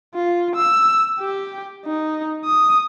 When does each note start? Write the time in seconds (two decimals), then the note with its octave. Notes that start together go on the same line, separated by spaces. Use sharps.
0.15 F4
0.56 E6
1.20 G4
1.86 D#4
2.45 D#6